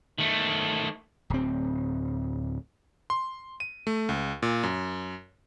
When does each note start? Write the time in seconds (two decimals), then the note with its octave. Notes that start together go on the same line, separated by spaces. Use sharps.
0.18 D#3 A3
1.30 D1 C4
3.10 C6
3.60 D#7
3.87 A3
4.09 C#2
4.42 A#2
4.63 F#2